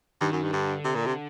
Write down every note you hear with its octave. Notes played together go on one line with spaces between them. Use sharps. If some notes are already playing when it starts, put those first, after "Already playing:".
G2 D#3
F#2
G2
G2 D3
C3
A#2
C3